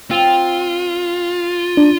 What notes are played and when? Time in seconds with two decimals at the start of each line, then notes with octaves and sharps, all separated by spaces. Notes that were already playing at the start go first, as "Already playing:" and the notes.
0.11 C4 F4
1.77 D4